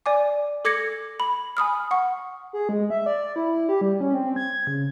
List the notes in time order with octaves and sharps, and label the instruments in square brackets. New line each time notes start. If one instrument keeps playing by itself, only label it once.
[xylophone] D5 G#5 D6
A4 D6 G#6 A#6 C#7
B5
G#5 B5 D#6 F6
F#5 C#6
[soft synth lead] G#4
G#3
E5
D5
E4
G4
G3
C#4
C4
G#6
C#3